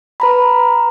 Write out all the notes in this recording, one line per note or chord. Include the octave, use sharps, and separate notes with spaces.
B4 A#5 B5